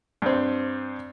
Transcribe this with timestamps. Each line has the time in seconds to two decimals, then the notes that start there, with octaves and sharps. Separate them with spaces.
0.22 G2 C4